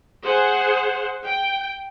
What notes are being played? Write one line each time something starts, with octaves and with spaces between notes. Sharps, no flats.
G#4 C5 F#5
G5